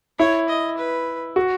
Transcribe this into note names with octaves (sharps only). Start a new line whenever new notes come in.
E4 C#5
D#5
B4
F#4